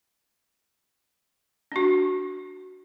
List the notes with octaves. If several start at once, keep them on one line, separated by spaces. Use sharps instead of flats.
D4 F#4